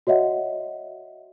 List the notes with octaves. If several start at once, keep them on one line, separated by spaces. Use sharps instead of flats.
F#4 C#5 D#5 E5 F#5